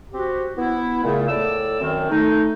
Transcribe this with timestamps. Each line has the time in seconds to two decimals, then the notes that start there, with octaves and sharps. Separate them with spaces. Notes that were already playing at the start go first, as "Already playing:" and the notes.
0.13 C4 F#4 G4
0.56 B3 E4
1.04 A#2 C#3 A3
1.28 A2 D5 E6
1.81 F#2 D#3 C4
2.10 A3 D#4